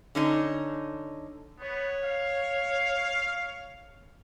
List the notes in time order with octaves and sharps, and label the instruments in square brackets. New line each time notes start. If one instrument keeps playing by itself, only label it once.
[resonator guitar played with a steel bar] D3 C#4 D#4
[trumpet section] B3 [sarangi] C#5
[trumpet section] F5